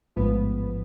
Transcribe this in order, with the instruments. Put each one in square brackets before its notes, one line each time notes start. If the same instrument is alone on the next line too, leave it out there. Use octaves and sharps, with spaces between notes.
[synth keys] A1 G#2 F3 B3